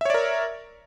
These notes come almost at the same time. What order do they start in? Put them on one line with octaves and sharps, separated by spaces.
E5 C#5 D5 A#4